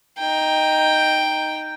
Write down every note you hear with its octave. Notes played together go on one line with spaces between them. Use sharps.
D#4 G5